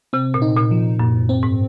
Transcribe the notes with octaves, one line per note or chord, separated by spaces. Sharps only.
C3 C4
A#2
D#4
A#2
F3
F#2 A#2
C4
G#2